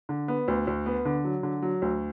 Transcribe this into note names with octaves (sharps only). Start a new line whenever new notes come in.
D3
B3
D2
D2
B3
D3
F#3
D3
F#3
D2